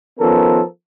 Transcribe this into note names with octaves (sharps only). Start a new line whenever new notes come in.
D#3 F3 B3 C#4 A4 A#4